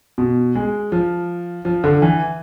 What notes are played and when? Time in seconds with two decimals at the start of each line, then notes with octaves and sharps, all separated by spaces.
0.18 B2
0.55 G#3
0.92 F3
1.65 F3
1.84 D3
2.02 E3